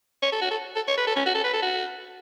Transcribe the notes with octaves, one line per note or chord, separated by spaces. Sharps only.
C#5
A4
F#4
A4
A4
C#5
B4
A4
C#4
F#4
A4
B4
A4
F#4